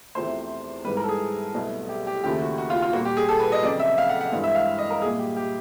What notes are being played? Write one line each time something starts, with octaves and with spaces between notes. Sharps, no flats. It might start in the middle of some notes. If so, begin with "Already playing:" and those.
E2 C3 F3 A3 C5
G#2 E3 G3 B4
A#4
A4
G#4
C2 B2 F#3 A3
G4
G4
D#2 C#3 F3 A3 G4
F#4
F#4
F4
F4
A#2 G3 A#3 F#4
G4
G#4
A4
B4
D#5
F2 C#3 F#3 D5
E5
F5
F#5
F#5
G2 E3 G#3
E5
F5
D#5
A#4
A#2 G3 A#3 G#4
G4
G4